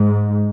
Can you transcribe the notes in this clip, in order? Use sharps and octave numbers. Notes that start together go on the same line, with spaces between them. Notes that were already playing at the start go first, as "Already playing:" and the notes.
Already playing: G#2